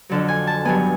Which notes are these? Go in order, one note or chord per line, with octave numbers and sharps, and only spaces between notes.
F2 D3 F#3
G#5
A5
G2 D#3 F#3 B3 G#5